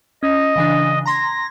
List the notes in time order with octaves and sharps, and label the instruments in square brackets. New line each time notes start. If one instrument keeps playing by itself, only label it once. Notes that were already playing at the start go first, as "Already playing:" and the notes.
[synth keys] C#4 [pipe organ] D#5
[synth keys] C#3 E3 D4
[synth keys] A#5 C6 G#6 [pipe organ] A#6